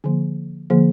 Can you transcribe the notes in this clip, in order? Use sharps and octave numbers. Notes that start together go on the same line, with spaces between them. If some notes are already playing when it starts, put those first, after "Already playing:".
D3 F3 A#3
D3 F3 A#3